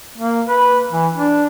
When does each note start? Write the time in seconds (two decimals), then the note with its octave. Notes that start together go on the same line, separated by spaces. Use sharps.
0.18 A#3
0.48 B4
0.92 E3
1.14 D4